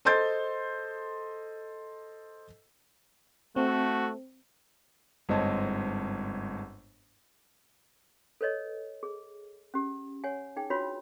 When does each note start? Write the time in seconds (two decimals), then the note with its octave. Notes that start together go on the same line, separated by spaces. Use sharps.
0.05 A4 C5 D#5 C6 G6 A6
3.56 A3 C4 F#4
5.29 G1 G#2 C4 C#5 D#5 A5
8.41 A4 B4 C#5 D#5
9.03 G#4
9.74 C#4 G4
10.24 C#5 F#5 G#5
10.56 D#4 G#4 G5
10.70 D4 F4 F#4 B4 C#5 B5